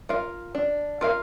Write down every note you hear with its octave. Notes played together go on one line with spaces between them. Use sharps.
F4 A#4 F5
D4
F4 A#4 F5